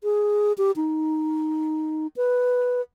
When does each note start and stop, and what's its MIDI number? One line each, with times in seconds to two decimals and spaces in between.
0.04 0.53 68
0.58 0.71 67
0.76 2.07 63
2.17 2.81 71